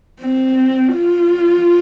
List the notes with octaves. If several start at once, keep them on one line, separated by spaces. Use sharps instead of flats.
C4
F4